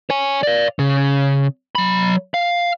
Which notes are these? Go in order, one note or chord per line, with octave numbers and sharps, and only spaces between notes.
C#5 G#5
D5 F5
C#3
F#3 B5
F5